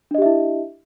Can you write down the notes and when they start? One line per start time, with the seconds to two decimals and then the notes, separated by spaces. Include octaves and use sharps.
0.11 D4
0.15 D#5
0.18 G4
0.22 E5
0.26 E4